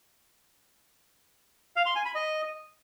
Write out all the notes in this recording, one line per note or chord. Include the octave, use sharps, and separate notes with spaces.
F5
C6
G#5
B5
D#5